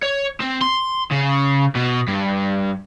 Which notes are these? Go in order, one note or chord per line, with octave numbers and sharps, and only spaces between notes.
C#5
C4
C6
C#3
B2
G2